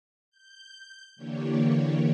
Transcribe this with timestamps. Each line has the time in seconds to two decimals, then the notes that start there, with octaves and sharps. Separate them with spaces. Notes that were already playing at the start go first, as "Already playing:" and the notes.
0.30 G6
1.16 D3 E3 A#3 D4 G4 C#5